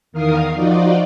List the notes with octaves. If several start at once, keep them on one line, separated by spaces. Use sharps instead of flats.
E2 D#3 A#4 F5 D#6 C7
F3 D#4 F4 F#4 D5